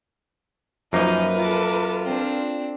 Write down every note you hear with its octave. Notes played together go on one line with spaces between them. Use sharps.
F#2 F3 A#3 D#4 A#4 B4
F4 A4 D6
C4 D4